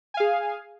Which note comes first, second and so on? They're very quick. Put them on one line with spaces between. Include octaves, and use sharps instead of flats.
G#5 F5 G#4